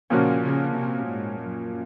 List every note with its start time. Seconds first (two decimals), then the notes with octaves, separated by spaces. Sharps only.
0.10 A#2 C#3 F3 A#3 C#4 F#4
0.43 C#3
0.75 C3
1.07 G#2
1.40 F#2